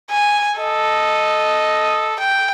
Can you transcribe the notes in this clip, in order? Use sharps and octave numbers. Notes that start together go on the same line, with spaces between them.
G#5
A4 D#5
G5